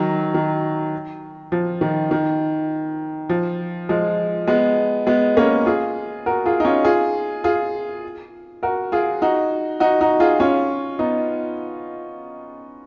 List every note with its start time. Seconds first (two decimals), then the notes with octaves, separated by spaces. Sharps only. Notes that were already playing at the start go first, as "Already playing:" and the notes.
Already playing: D#3 F#3
0.34 D#3
1.52 F3
1.81 D#3
2.11 D#3
3.29 F3
3.89 F3 G#3
4.48 G#3 B3
5.07 G#3 B3
5.37 A#3 C#4
5.66 F4 G#4
6.26 F#4 A#4
6.46 F4 G#4
6.60 D#4
6.65 C#4 F4
6.85 F4 G#4
7.44 F4 G#4
8.63 F#4 A#4
8.92 F4 G#4
9.22 D#4 F#4
9.80 D#4 F#4
10.01 D#4 F#4
10.20 F4 G#4
10.39 C#4 F4
10.99 B3 D#4